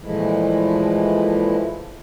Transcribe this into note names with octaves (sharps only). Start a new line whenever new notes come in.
A#2 E3 F3 G#3 A3 E4